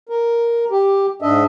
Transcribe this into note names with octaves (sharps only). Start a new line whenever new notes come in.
A#4
G4
G#2 D4 D#5 E5